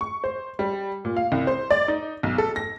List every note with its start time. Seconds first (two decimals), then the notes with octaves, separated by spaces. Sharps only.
0.01 C#6
0.24 C5
0.59 G3
1.05 A#2
1.17 F5
1.32 C2
1.47 C5
1.71 D5
1.88 D#4
2.23 B1
2.38 A4
2.56 A#6